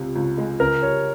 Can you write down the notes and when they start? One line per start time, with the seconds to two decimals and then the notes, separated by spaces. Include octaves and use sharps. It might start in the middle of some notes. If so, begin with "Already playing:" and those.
Already playing: C#2 C3
0.15 C#2
0.38 G#3
0.60 C#3 A#4
0.82 G3 C#5